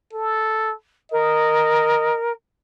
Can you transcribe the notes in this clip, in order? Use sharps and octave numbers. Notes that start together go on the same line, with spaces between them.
A4
A#4 D#5